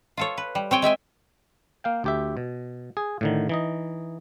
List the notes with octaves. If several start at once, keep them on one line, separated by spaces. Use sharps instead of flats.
F4 A4 C#5
B4
G3
C4 C#5 G5 G#5
G#3 E5 G5 G#5
A#3 F5 G5
D2 G4 E5
B2
G#4
A2 D3 D#3
E3 D#4 D#5